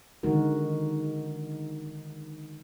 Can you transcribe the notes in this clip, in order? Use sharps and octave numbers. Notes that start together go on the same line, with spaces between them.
D3 D#3 G#3 D#4 F#4 A#4